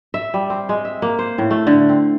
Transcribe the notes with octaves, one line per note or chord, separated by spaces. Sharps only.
E5
G3
C4
G#3
E5
A#3
C5
A2
A3
D3
C4